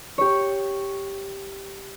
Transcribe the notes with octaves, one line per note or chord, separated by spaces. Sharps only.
G4 C#5